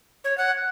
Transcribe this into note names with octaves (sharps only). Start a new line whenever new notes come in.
C#5
F#5